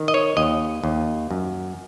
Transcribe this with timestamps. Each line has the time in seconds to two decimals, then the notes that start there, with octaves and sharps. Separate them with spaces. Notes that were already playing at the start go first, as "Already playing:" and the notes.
Already playing: D#3
0.08 D#5
0.14 C#5
0.37 D#2 D#5
0.84 D#2
1.31 F#2